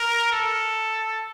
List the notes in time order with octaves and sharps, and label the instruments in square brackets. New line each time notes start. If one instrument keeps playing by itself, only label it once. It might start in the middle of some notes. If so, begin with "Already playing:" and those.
Already playing: [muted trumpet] A#4
A4